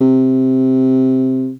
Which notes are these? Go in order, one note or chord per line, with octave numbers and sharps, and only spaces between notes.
C3